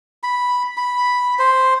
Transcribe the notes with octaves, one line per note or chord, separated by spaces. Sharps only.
B5
B5
C5